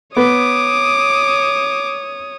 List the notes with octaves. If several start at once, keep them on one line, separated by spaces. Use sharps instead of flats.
B3 C#5 D6 D#6